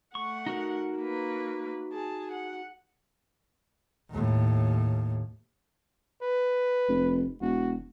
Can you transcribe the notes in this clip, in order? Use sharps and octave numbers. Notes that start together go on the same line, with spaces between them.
A3 F#5 C#6
D#4 F#4 A#4
A#3 B4
G#4 A5
F#5
D#2 A2
B4
F1
E1 F#4